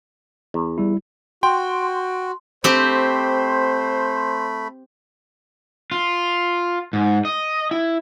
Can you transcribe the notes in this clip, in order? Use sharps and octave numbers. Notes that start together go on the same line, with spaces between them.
E2
G3 E4
F#4 G5 C6
A3 C4 G4 C5 B5
F4
G#2
D#5
E4